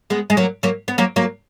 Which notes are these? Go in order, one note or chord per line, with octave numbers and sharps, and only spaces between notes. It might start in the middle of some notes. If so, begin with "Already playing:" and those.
G#3 B3
G#3
F#3 A#3
F#3 A#3
B3
F#3 A#3
F#3 A#3